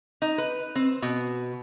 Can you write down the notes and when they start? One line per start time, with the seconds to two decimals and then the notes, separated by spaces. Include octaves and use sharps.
0.22 D#4
0.38 B4
0.75 C4
1.02 B2